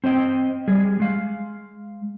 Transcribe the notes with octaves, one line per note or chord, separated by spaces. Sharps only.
C4 C5 D#5 G5
G3 G#4
G#3 F5